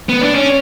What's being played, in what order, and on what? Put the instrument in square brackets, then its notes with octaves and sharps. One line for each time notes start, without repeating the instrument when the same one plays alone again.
[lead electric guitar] B3
D4
C#4